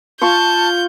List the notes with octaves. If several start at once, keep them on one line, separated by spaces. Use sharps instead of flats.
F4 F5 A5 C#6 G6